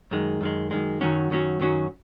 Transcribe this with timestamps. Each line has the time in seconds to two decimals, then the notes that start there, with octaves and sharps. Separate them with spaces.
0.11 F#2 D#3 G#3
0.41 F#2 D#3 G#3
0.71 F#2 D#3 G#3
1.01 F#2 D#3 F#3 C#4 F#4
1.30 F#2 D#3 F#3 C#4 F#4
1.60 F#2 D#3 F#3 C#4 F#4